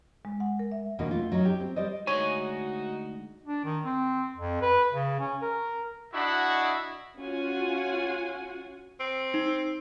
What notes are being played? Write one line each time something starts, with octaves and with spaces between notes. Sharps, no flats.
G#3
F#5
A#4
E5
E2 B2 D3 A#3 C#4 D#4
A3 F4
F#3 C#4 D#4
G4
C4
G3 C5 D5 D#5
D2 G#3 D#4 F#4 C#5 G#5
D4
D#3
C4
F2
B4
C#3
C#4
A#4
D4 E4 F#4 D#5 F#5 B5
C#4 F4 F#4 F#5 G#5
C4
D#4